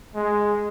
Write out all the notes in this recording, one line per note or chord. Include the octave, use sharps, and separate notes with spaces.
G#3